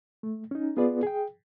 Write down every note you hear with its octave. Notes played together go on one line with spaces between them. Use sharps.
A3
C#4 D#4
B3 F4 G#4 B4 D5
G#4 G5